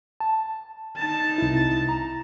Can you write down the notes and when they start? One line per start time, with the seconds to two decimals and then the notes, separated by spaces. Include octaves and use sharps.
0.20 A5
0.97 D#4 A5
1.38 C2 E4
1.89 A#5